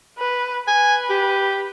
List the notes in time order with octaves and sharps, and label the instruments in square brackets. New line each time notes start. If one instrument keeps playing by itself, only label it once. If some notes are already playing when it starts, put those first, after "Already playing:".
[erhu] B4
[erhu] B4 [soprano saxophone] G#5
[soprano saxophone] G4